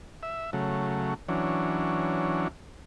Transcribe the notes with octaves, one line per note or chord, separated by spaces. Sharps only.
E5
C#3 F#3 A3
E3 F#3 C#4 D4